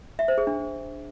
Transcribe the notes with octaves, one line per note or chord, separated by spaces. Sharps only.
E5
C5
G#4
D4